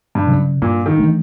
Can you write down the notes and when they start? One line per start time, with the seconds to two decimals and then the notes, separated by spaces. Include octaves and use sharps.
0.15 G2
0.27 C#3 F#3
0.62 G2 A#2
0.86 D#3
0.97 E3 A3 D4